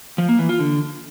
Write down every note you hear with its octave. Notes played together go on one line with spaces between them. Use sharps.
F3
A#3
E3
F4
D3